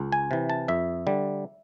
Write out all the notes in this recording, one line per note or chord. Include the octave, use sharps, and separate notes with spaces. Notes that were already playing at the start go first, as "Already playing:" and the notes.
Already playing: C#2
G#5
C3 E3
A5
F2 E5
D3 G3